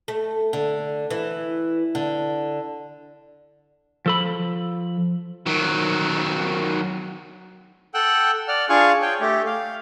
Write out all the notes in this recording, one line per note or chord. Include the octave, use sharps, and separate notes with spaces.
A3
D3
E3
D3
F3 A4 B5
D#3 F#3
A4 F#5 G5 E6 F#6
D5 F#5 F6
D4 F4 G#4 F5 G#5 C#6
C#5 G5
A3 G4
F5